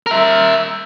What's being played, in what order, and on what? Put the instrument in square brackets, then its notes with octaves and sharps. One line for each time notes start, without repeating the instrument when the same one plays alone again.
[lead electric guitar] A#4 E5